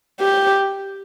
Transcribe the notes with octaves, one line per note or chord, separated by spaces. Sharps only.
G4